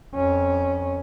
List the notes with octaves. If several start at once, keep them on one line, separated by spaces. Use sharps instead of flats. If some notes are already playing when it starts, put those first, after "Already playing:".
F2 C#4